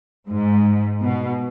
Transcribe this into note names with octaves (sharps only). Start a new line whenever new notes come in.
G#2
B2